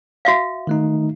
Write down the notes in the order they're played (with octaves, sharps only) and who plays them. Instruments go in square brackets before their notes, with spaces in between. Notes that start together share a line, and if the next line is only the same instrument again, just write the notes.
[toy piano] F#4 E5 F5
[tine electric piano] D#3 A3 D#4